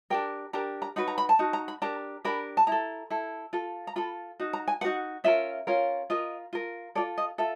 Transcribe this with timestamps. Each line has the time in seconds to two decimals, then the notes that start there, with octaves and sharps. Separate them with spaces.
0.10 D4 G4 A#4 G5
0.53 D4 G4 A#4 A#5
0.82 A#5
0.96 D#4 F#4 B4 B5
1.08 A#5
1.18 B5
1.29 A5
1.39 D#4 F#4
1.53 A#5
1.68 B5
1.82 D4 G4 A#4 A#5
2.25 D4 G4 A#4 B5
2.57 A5
2.67 E4 A4 A#5
3.10 E4 A4
3.53 F4 A4
3.87 A#5
3.96 F4 A4 B5
4.40 D#4 F#4
4.53 A#5
4.68 G#5
4.81 B4 F#5
4.84 D#4 F#4
5.24 C#4 F4 A#4 E5
5.67 C#4 F4 A#4
6.10 F4 A#4 D#5
6.53 F4 A#4
6.95 F4 A4 D5
7.18 D#5
7.38 F4 A4 E5